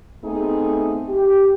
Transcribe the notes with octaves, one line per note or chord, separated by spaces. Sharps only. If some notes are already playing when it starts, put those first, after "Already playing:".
A3 B3 C4 D#4 G#4
G4